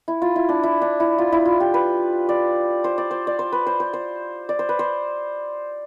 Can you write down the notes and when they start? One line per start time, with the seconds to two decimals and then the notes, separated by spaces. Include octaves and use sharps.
0.08 E4
0.22 F4
0.36 E4
0.49 D4
0.63 E4
0.81 D4
1.00 E4
1.18 F4
1.32 E4
1.45 F4
1.60 G4
1.74 B4
2.29 D5
2.84 C5
2.98 D5
3.11 C5
3.27 D5
3.39 C5
3.52 B4
3.66 C5
3.80 C5
3.93 C5
4.49 D5
4.59 C5
4.69 B4
4.79 C5